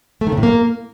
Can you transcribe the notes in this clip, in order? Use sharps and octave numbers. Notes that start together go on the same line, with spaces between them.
A3
D#3
C#3
A2
A#3